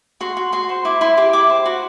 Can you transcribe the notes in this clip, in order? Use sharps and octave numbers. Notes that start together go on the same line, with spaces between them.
F#4 C6
F#4
F#4 C6
C5
E4 D6
E4 C6
G4 D6
E4 D6
C5
F#4